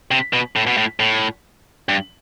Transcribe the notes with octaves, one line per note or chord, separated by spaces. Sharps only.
C3
B2
A2
B2
A2
A2
G2